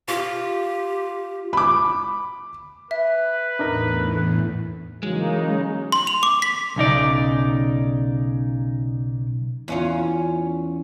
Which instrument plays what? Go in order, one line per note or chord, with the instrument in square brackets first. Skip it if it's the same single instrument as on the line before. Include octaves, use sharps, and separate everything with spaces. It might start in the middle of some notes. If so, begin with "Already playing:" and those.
[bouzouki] F4 [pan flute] G4
[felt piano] B5 D6
[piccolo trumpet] B4 [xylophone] E5
[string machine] E2 A2 [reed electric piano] D4 D#4 A#4
[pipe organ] C#3 D#4 [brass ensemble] E3 F#3 A#3 [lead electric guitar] G#3
[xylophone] C6
F7
D6
B6
[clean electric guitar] B1 C#3 D#4 D5
[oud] E2 C#4 F4